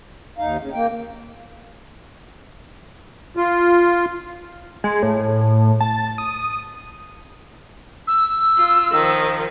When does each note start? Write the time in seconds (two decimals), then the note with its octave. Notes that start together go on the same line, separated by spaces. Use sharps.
0.38 D#2 D#4 F5
0.59 C#3
0.74 A#3 G5
3.37 F4
4.84 G#3
5.03 A2
5.80 A5
6.18 D#6
8.07 E6
8.58 F4
8.92 D#3 F3